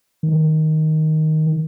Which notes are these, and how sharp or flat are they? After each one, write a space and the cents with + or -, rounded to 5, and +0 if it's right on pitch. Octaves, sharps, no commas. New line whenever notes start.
D#3 +5